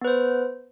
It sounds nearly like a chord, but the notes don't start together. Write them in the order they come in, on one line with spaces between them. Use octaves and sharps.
B3 B4 C5